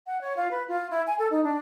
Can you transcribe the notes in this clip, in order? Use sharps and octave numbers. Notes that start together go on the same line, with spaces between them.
F#5
C#5
F4
B4
F4
E4
G#5
A4
D#4
D4